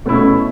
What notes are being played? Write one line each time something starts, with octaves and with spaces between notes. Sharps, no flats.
B2 A3 C#4 E4